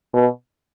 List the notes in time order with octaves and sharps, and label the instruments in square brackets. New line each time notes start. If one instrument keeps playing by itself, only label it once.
[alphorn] B2